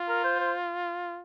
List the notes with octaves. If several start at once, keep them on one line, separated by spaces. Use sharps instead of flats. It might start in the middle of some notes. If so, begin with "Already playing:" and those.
Already playing: F4
A#4
C5
C5